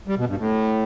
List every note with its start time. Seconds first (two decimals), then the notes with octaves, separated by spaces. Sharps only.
0.08 G3
0.18 B2
0.28 G2
0.39 A2